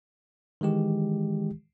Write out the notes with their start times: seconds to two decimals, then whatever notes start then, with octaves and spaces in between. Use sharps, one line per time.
0.61 D#3 E3 G#3 G4